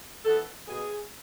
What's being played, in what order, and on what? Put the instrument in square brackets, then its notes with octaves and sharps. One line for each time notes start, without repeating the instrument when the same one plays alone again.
[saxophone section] E3 B3 A4
B2 G#4